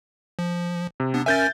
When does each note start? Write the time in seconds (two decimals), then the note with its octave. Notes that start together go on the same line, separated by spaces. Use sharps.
0.39 F3
1.00 C3
1.14 B3 D4
1.26 C#4 A#4 E5 G#5 G6 A6